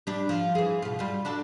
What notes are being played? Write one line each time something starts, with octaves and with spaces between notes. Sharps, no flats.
G3 D4
F3
E3 G#4
B2 F4
G3 F4
D4 F#4 A4